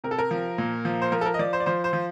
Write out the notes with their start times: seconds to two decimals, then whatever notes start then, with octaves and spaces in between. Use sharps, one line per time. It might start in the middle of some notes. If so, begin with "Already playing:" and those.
0.04 C3 A#4
0.11 A4
0.19 A#4
0.31 F3
0.58 A#2
0.85 F3
1.02 C5
1.12 F3 A#4
1.21 A4
1.26 A#4
1.34 D#5
1.39 F3 D5
1.53 C5
1.60 D5
1.66 F3 C5
1.84 C5
1.93 F3